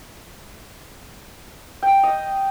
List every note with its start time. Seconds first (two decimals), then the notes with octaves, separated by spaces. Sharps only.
1.83 G5
2.03 D#5